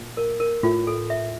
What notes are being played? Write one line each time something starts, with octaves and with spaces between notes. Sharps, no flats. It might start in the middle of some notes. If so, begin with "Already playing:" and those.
Already playing: A#2
A#4
A#4
A2 F4
A4
E5